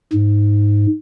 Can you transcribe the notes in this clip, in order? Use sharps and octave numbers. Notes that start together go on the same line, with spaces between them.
G#2